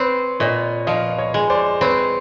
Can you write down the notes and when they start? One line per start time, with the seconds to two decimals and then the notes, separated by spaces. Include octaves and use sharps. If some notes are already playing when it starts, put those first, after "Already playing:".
Already playing: C4 B4 C#5
0.40 A#2 C#5 D#5
0.87 F3 D#5 F5
1.18 C#5 D#5
1.34 G#3
1.50 C5 D5
1.81 C4 B4 C#5